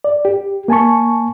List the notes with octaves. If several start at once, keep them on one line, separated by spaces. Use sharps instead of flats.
D5
G4
A#3 G#5 A5 C#6